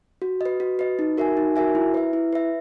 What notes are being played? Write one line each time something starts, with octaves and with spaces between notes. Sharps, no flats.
F#4
B4 D#5
F#4
B4 D#5
D#4
F#4 A#4 E5 G#5
D#4
F#4 A#4 E5 G#5
E4
B4 E5
E4
B4 E5